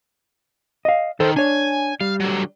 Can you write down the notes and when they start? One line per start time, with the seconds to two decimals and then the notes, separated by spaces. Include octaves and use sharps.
0.85 D#5 F5
1.20 D#3 A4 C5
1.36 D4 C#5 G#5
2.01 G3 F5
2.20 D3 F#3